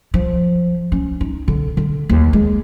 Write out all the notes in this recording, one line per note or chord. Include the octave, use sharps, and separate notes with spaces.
F3
C#4
D#4
D3
D3
D#2
G#3